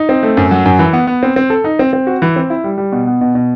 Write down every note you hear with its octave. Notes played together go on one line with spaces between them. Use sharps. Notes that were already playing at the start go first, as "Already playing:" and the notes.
Already playing: D#4
C4
A3
F#2
F#3
F#2
E3
B3
B3
C4
C4
A4
D#4
C4
C4
F#4
E3
C4
E4
G3
G3
B2
B3
B2
B2